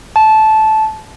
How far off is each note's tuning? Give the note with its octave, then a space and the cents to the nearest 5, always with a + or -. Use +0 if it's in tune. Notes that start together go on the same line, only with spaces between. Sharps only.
A5 -15